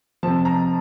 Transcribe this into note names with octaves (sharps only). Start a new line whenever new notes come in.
C3 F3 A5
A#5